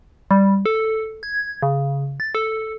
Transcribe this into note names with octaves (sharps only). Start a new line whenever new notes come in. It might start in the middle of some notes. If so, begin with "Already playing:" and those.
G3
A4
G#6
C#3
A6
A4